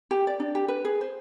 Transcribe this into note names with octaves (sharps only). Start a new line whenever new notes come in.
G4
D5
D4
G4
B4
G#4
C5